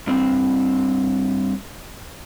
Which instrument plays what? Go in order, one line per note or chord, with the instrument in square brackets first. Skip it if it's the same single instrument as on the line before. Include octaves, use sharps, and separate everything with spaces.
[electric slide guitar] G2 C4